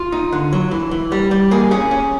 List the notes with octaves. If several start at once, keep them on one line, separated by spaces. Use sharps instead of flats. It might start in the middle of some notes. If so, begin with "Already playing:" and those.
Already playing: F4
D#4
D3
F#3
E3
E3
G3
G3
A#3 G#4
C#4 G#4
C#4